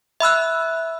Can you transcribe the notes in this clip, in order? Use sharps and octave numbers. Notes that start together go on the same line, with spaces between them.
E5 B5 E6 F#6